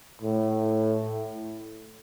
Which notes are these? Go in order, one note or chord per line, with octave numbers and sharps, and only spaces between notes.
A2